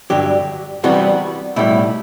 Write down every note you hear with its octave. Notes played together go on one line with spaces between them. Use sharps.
G2 D3 F#3 G4
C2 C3 E3 G3 B3 F#4
B1 A2 G3 E4